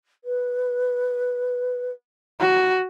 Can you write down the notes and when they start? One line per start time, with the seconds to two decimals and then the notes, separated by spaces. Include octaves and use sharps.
0.24 B4
2.40 F#4